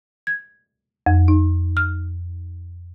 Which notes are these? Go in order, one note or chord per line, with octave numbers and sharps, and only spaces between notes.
G#6
F2
D#4
F6